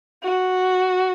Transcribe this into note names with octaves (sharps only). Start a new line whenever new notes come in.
F#4